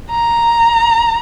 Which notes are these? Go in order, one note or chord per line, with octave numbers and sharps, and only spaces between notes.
A#5